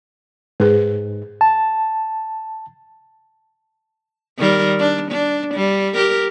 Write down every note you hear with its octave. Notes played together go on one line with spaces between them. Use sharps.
G#2 G#4 B4
A5
D#3 G3 A#4
D4
D4
G3
G4 A#4